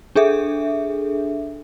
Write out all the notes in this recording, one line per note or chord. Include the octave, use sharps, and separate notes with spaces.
D4 G#4 A4 E5